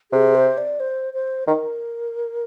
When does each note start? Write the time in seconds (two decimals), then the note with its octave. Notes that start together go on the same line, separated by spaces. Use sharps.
0.12 C3 G#4
0.35 C5
0.58 D5
0.80 C5
1.14 C5
1.47 D#3 A#4